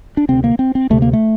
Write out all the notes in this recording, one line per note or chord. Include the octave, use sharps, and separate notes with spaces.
D4
D2 C3 C4
A#3
C4
C4
D2 C3 A3
A#3
A3